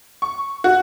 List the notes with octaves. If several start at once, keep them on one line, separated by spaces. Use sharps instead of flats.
C#6
F#4